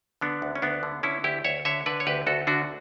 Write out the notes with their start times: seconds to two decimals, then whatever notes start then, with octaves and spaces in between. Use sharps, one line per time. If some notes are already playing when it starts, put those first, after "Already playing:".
0.21 D3 B3 D4
0.42 D2
0.55 C#4
0.62 D2 B3 D4
0.83 D3
1.03 D3 C#4 E4
1.24 D2 E4 G4
1.44 D2 C#5 E5
1.65 D3 C#5 E5
1.86 D3 B4 D5
2.00 C#5
2.07 D2 G4 B4
2.27 D2 F#4 A4
2.47 D3 D4 F#4